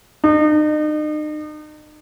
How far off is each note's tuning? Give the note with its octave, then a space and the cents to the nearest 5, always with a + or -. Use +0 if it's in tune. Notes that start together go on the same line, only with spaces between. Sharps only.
D#4 -40